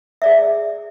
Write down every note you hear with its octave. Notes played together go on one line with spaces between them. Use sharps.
G#4 D5 E5